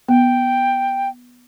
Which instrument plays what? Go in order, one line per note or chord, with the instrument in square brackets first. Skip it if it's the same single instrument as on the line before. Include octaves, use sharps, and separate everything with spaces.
[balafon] B3 [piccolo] G5